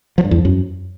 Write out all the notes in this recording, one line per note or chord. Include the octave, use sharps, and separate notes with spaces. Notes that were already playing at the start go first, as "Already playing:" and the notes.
F3
G2
E2
F3
F#2